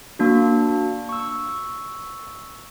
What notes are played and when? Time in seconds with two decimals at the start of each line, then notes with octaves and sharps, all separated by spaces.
0.19 A#3 D4 F#4
1.09 C#6 E6